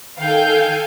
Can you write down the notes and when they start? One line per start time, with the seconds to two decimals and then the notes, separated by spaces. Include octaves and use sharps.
0.18 D#3 A4 F5 G5 G#5 G6